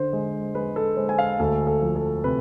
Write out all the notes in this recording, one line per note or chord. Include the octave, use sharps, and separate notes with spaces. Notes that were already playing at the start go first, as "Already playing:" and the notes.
Already playing: D3 C5
G#3
G#3 B4
A4
G#3 C5
G#5
F5
D2 A4
A4
F3
A4
C3 B4